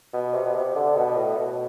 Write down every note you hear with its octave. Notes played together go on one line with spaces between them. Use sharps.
B2
C3
B2
C3
D3
B2
A2
B2